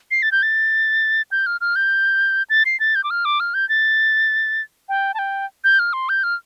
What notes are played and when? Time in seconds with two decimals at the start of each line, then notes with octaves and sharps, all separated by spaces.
0.11 C7
0.22 A6
0.32 G6
0.43 A6
1.32 G6
1.46 F6
1.61 F6
1.76 G6
2.50 A6
2.66 C7
2.80 A6
2.95 G6
3.04 D6
3.10 F6
3.25 D6
3.40 F6
3.54 G6
3.69 A6
4.89 G5
5.14 A5
5.19 G5
5.64 G6
5.79 F6
5.93 C6
6.09 G6
6.24 F6